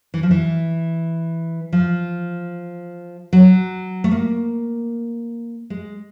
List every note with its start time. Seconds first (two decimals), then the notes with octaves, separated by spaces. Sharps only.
0.14 E3
0.23 F3
0.31 E3
1.73 F3
3.33 F#3
4.04 A3
4.11 A#3
5.70 G#3